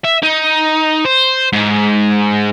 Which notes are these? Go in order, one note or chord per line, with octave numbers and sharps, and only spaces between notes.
E5
D#4
C5
G#2